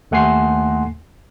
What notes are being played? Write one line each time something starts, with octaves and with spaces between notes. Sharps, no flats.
D#2 A3 F#5 G#5 C6 C7